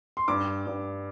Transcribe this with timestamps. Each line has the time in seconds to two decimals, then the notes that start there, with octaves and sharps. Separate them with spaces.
0.17 C6
0.28 G2 D6
0.67 G2